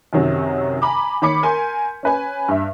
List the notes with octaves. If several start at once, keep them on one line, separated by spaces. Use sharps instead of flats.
F#2 C3 D#3 F#3
G#5 A#5 B5 D6
D#3 C#5 B5 D6 B6 C#7
A#4 G#5 C6 G6
C#4 B4 G#5
G2 E5